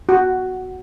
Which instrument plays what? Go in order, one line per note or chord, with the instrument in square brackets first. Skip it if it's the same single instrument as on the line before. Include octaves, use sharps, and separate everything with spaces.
[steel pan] F#4